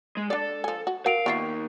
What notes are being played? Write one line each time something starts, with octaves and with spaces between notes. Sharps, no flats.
G#3
D4 A4 D5
F3 G#5
F#4
F#4 A#4 F5 D7 F7
D#2 B3 F4 E5 C#6 C7